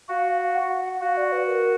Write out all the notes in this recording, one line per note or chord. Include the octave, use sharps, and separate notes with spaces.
F#4 F5
F5
F#5
F#4 F5
D5
B4
A#4